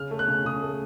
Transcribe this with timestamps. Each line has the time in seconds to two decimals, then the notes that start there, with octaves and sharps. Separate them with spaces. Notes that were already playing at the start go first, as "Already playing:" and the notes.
Already playing: C#3 F6
0.11 A3
0.19 F#6
0.28 C#3
0.45 C#3 D#6
0.62 A3